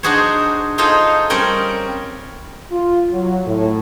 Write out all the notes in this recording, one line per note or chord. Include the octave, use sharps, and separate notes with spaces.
D4 D#4 F#4 G#4 C5 C#5
D#4 F4 G#4 A4 C5 D#5
G3 C4 C#4 A#4 C#5 G5
F4
F#3
A2